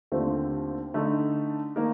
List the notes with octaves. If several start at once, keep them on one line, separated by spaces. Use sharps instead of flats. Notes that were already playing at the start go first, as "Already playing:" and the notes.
D#2 D3 A3 C4 F4
D3 A3 D#4 A4
D#3 A#3 D#4 A#4